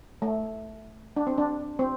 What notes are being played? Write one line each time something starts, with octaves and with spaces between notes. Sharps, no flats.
A3
D4
C4
D4
C4